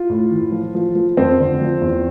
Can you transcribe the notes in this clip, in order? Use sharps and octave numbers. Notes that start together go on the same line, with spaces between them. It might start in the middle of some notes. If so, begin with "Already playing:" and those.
Already playing: F4
A2
E3
F3
F3
F3
F2 C4
D3
F3
E2